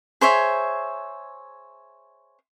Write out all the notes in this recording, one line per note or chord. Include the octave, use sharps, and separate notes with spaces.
G#4 C5 C#5 E5